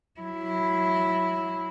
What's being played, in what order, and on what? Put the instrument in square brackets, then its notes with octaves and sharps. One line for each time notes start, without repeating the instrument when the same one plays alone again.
[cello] F#3 E4